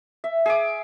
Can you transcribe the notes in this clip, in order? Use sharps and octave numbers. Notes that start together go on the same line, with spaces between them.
E5
G#4 E5 D6